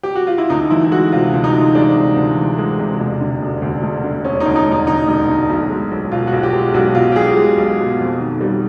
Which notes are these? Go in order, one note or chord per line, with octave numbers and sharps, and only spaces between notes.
G4
F#4
F4
E4
D2 D#4
E3 E4
G#3 F#4
C3 F4
D2
D#4
E3
G#3 D4
C3
D2
E3
G#3
C3
E1
D3
E1
D2
E1
D3
E1 C#4
D#4
D2
D#4
E1
D#4
D3 D#4
E1
D2
B1
G#3
B1
B2 F4
F#4
B1
G4
G#3
B1 F#4
B2 F4
G4
B1 G#4
G#3
B1
B2
F2
D#3
G3